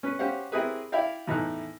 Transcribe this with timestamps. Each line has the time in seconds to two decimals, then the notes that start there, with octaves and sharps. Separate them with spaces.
0.03 C#4 B4
0.19 C#4 G4 C5 F5 F#5
0.52 C4 E4 G4 G#4 A#4 B4
0.92 E4 D5 E5 F5 G5
1.28 E2 A2 E3 D#4 F#6